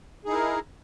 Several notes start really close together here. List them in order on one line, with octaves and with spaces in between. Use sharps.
G#4 D#4 E4 A#4